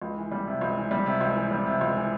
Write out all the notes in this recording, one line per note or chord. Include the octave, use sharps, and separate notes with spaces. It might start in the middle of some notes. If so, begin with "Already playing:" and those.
C#2
E3
G3
C3
C#2
E3
G3
C3
C#2
E3
G3
C3
C#2
E3